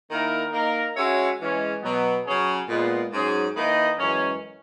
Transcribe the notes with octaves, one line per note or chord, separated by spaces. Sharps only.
D#3 A#3 E4 A#4
A#3 D#4 A#4
G#3 C#4 F#4 C#5 E5
E3 G#3 C#4
B2 F#3 B3
C#3 F#3 C#4 G#4
A#2 G#3 B3
G#2 F#3 C#4 G#4
D#3 A#3 E4 B4 D#5
F#2 E3 G#3 C#4